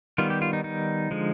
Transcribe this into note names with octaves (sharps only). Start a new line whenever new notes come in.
D#3 G3 B3 F4
G4
F4
D#4
D#4
D3 F3 G#3